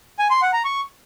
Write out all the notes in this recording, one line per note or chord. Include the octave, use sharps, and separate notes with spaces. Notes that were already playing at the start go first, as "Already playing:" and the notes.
G#5
C6
F#5
A#5
C#6